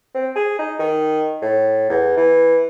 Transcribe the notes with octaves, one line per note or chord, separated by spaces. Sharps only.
C4
G#4
D#4
D#3
A2
E2
E3